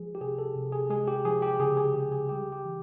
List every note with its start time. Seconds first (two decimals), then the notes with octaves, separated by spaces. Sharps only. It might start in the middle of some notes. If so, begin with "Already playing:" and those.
Already playing: F3 G#3 G#4
0.15 G4
0.21 C3 G#4
0.39 A4
0.56 C3
0.72 G#4
0.90 G#3 G#4
1.07 G4
1.25 F3 G#4
1.42 G4
1.60 C#3 G#4
1.77 G#4
1.94 C#3 G4
2.12 G#4
2.29 G3 G4
2.53 G4
2.65 E3